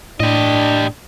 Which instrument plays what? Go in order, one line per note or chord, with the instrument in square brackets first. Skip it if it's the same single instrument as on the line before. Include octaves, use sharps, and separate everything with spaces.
[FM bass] A2 [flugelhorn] D4 [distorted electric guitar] G4 D#5